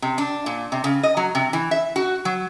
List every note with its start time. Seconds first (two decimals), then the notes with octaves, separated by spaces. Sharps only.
0.02 C3
0.18 D4
0.46 A#2
0.72 C3
0.84 C#3
1.03 D#5
1.17 F#3
1.35 C3
1.53 E3
1.71 E5
1.96 F#4
2.25 F#3